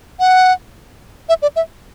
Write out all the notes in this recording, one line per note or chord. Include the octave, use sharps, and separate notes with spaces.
F#5
E5
D5
E5